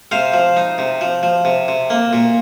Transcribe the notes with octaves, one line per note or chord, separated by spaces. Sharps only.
C3 C5 F5
F3
D#4
C3
F3
F3
C3
C3
A#3
A#2